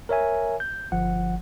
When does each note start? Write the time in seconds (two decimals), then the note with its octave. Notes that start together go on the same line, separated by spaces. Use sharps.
0.09 A#4 C#5 E5 G#5
0.60 G6
0.92 G1 F3 F#5